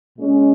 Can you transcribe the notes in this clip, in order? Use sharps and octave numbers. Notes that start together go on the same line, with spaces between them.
A#2 G#3 C#4